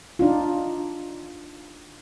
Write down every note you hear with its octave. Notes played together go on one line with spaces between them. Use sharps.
D4 D#4 F4